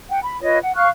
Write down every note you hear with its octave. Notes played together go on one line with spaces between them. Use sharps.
F#5 G5
B5
F4 B4 C#5 D#5
F#5
F5 C#6 F6 F#6